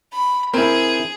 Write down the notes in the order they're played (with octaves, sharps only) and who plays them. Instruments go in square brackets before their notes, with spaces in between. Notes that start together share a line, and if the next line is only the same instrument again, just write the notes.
[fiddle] B5
[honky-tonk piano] C4 [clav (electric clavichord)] E4 A#4 [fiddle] G#4